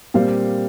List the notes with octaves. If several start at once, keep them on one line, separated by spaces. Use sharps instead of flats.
A#2 G3 C4 F5